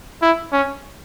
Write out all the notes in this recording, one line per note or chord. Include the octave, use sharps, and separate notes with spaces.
E4
C#4